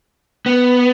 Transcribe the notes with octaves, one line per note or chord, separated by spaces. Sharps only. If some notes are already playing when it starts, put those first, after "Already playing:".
B3